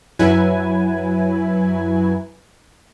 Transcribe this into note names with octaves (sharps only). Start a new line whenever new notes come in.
F#2 F#3 E4 B4 G#5